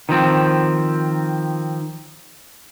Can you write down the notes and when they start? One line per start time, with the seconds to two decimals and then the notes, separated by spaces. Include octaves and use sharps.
0.09 D#3 F3 C4